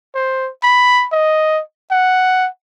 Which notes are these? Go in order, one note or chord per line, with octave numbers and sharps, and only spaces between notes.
C5
B5
D#5
F#5